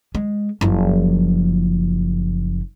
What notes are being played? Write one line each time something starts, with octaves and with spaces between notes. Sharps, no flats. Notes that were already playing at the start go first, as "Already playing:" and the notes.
G#3
F#1 F3